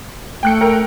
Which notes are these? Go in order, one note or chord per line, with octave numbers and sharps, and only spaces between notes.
A3 G5 F#6 C#7
A#4 G5